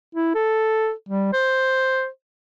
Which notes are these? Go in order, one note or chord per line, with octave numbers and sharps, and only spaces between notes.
E4
A4
G3
C5